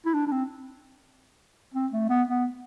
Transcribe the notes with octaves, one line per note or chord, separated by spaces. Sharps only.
E4
D4
D4
C4
C4
A3
B3
B3